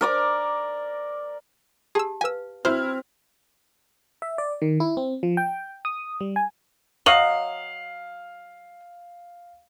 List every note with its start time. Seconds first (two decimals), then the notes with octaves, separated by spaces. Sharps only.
0.01 A#4 D5 D6
1.95 G4 G#4 A5 E6
2.21 B4 F5 G#5 E6
2.65 C4 E4 F#4 C5 F6
4.22 E5
4.38 D5
4.62 D#3
4.80 E4
4.97 C4
5.23 F3
5.37 G5
5.85 D#6
6.21 G3
6.36 G#5
7.06 F#3 C#5 D#5 F5 F#7